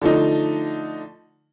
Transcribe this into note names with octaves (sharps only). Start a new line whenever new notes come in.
D3 F3 A3 D#4